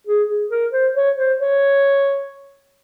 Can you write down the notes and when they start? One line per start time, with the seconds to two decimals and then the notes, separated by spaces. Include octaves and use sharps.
0.07 G#4
0.29 G#4
0.50 A#4
0.72 C5
0.96 C#5
1.18 C5
1.39 C#5